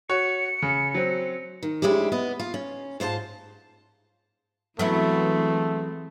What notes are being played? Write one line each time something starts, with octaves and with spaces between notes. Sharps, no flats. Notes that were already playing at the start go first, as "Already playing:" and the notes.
F#4 C#5 C#7
C#3
F#3 C4
D#3
D2 G#3 C#4 E4 G4
B3 D#5
F4
C#4
G#2 F4 C5 D5 A5
E3 F#3 G#3 A3 B3 C4 E4